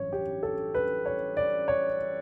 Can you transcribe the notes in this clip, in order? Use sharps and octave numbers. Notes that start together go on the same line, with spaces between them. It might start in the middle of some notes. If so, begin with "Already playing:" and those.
Already playing: A1 G2 F#3 C#5
G4
A4
B4
C#5
D5
C#5